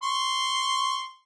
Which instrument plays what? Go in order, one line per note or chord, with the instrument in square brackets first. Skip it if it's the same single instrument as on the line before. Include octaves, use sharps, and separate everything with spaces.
[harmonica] C6 C#6